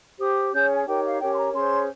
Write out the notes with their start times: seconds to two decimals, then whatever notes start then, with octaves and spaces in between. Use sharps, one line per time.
0.18 G4 C5 D#6
0.52 C#4 G#4 C#5 G6
0.69 G#5
0.86 D#4 G4 A#4 C#5 G5
1.03 F5
1.19 C#4 G4 A#4 C#5 G5
1.32 C6
1.37 A#5
1.53 C#4 G#4 C5 C6